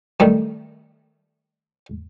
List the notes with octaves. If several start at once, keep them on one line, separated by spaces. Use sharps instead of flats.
D#3 G3 A3